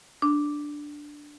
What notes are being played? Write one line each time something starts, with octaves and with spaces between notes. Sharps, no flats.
D4